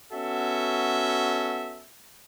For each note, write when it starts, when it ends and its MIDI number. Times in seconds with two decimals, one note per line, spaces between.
0.12 1.85 59
0.12 1.85 61
0.12 1.85 66
0.12 1.85 69
0.12 1.85 76